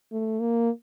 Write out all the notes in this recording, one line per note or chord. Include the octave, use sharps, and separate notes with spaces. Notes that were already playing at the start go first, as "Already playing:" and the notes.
A3
A#3